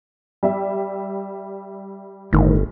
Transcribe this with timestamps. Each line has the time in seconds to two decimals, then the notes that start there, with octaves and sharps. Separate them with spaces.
0.43 G3 E5
2.33 G1 A2 D#3